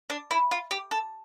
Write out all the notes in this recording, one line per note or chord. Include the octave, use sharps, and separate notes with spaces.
D4
E4
F4
G4
A4